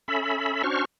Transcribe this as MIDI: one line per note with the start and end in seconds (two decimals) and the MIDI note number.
0.08 0.63 61
0.08 0.63 69
0.08 0.63 76
0.08 0.63 83
0.64 0.85 61
0.64 0.85 62
0.64 0.85 66
0.64 0.85 72
0.64 0.85 85
0.64 0.85 89